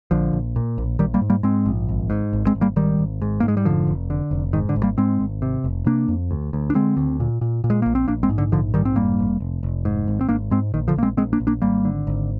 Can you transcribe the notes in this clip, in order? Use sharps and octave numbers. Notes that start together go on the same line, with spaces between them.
A#1 D3 F3
A#1
A#2
A#1
A#1 D#3 G3
G3 A#3
G#2
G3 A#3
G#2 G#3 C4
A#1
G#1
G#2
G#1
G#3 C4
G#1
G3 A#3
G#1 D#3 G3
G#1
G#2
G#2 A#3
G#3
G3
F1 D3 F3
F1
D3
F1
G#2 D#3
D3
G#1
G3 A#3
G#2 G#3 C4
G#1
C3
F1
C3 A#3 D4
F2
D2
D2
D4
D3 G#3 C4
D2
A#2
A#2
A#2
G#3
A#1 A#3
C4
A#1 A#3 D4
G#3 C4
G#2
D3
A#1 D3 F3
G#2 D#3 G3
C4
F1 G3 A#3
F1
F1
F1
G#2
G#1
C4
G#1 A#3 D4
G#2 G#3 C4
A#1 D#3
D3 F3
A#1 A#3
G#3 C4
A#1 G#3 C4
A#3 D4
A#1
A#3 D4
G#1 G3 A#3
D3
G#1